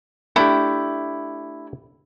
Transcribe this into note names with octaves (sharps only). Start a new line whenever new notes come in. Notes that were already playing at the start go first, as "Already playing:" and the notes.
A3 D4 E4 G4